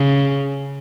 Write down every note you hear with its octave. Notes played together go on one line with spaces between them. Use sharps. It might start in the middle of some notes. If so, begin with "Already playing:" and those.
Already playing: C#3